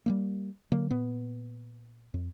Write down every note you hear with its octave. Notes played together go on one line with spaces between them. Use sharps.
G3 A3 A#3
D3 F#3 A#3
A#2 B3
F2